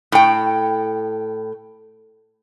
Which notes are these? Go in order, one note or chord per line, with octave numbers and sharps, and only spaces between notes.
A2 G5